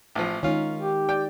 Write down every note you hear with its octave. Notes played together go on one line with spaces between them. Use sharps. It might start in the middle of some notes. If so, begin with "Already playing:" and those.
A1 F3
D#3 G#3 C#4 D#4 F4
G4
D5 G5